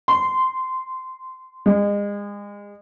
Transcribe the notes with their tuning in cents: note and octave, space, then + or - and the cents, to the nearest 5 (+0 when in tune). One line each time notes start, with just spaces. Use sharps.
C6 -15
G#3 -30